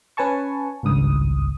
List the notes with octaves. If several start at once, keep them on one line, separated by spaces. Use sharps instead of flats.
C#4 B4 G#5 A5 C#6
G#1 C#2 G2 D#6